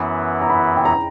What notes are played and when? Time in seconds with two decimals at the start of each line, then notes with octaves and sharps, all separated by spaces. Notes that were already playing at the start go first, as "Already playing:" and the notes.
Already playing: F#2 E3 B3 E4
0.42 A#5
0.50 B5
0.76 G5
0.85 A#5